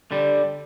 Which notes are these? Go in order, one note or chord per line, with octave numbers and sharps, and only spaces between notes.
D3 G3